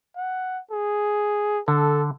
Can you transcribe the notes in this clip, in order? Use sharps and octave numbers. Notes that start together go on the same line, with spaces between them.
F#5
G#4
D3 A4